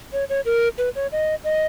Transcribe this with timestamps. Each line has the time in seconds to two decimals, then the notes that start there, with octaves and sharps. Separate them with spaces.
0.13 C#5
0.29 C#5
0.45 A#4
0.78 B4
0.96 C#5
1.12 D#5
1.44 D#5